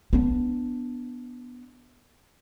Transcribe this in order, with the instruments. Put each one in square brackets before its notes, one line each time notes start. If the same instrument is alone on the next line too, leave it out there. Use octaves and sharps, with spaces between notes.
[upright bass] B3 D4